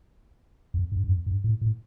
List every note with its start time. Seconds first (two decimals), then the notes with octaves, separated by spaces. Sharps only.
0.74 F2
0.92 G2
1.04 G2
1.09 F2
1.26 G2
1.44 A2
1.61 A2